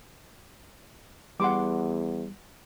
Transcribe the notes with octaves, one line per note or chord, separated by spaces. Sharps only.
E2 G3 F#5 C6 D6